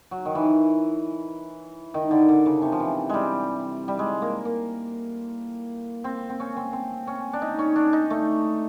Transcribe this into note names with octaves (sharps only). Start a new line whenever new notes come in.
F#3
D#3
E3
D#3
D3
D3
C#3
C3
F3
E3
G3 G#3
G3
G#3
A#3
A#3
C4
C4
C#4
C4
C4
C#4
D4
D#4
C#4
D4
D#4
A3